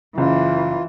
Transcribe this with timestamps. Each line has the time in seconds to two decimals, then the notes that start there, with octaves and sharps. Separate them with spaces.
0.18 F#1 E3 F4